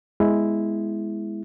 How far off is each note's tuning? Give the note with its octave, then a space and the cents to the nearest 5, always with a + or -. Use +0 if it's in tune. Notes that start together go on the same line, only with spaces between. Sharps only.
G#3 +5 B3 +0 E4 +0